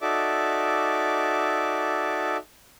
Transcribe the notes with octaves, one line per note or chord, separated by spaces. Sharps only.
D#4 F#4 A4 D5 E5 D6